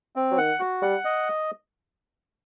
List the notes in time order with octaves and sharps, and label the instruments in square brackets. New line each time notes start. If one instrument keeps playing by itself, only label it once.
[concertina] C4
[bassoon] F#3
[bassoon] D#3 [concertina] F#5
[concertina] F#4
[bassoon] G3 [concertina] F#5
[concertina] D#5